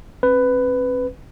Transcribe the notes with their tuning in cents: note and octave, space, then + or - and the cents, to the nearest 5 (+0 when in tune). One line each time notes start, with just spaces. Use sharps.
C4 +45 B4 +15